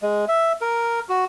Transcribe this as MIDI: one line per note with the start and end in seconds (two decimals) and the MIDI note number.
0.02 0.25 56
0.28 0.53 76
0.61 1.00 70
1.09 1.25 66